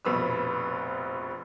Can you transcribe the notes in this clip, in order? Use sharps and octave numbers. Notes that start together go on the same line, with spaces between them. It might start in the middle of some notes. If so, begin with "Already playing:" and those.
F1 A#1 B2 B4 E6